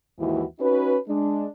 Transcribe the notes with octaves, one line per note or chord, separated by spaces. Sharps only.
D#2 G#2 E3 E4 F#4
C#4 D#4 F#4 B4
G#3 D4